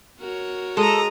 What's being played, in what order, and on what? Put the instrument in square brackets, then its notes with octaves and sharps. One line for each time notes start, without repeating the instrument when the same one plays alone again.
[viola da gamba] F#4 A#4 C#5
[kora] G#3 [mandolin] A4 [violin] A#5 D#6